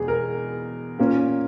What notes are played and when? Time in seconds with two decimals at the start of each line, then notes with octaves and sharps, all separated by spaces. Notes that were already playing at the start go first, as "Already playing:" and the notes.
Already playing: E2 B2 G#3 G#4
0.08 A#4
0.99 A#2 A#3 C#4